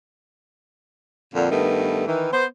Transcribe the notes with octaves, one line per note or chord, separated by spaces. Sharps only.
F2 A#2 D3
G2 D#3 A3 B3
D#3 E3
B3 C5